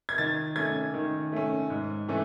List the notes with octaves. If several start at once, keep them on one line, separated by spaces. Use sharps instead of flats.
G#6
D#3 A6
A3 C#4 G#6
D#3
A3 C#4
G#2
E3 A3 C#4